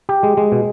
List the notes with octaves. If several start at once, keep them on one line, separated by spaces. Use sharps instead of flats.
G4
G#3
G#3
B2